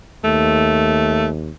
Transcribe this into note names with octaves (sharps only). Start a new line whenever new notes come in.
D#2 A3